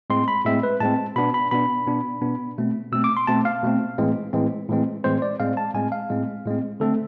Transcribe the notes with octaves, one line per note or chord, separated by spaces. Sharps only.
A2 G#3 C4 C6
B5
A2 G#3 C4 E5
B4
A2 G#3 C4 A5
B2 B3 D4 B5
B5
B2 B3 D4 B5
B2 B3 D4
B2 B3 D4
B2 A3 C4
B2 A3 C4 E6
D6
C6
B2 A3 C4 A5
F5
B2 A3 C4
A2 E3 G#3 C4
A2 E3 G#3 C4
A2 E3 G#3 C4
A2 E3 G#3 C4 C5
D5
A2 G#3 C4 F5
A5
A2 G#3 C4 G#5
F5
A2 G#3 C4
A2 G#3 C4
D3 A3 C4 A4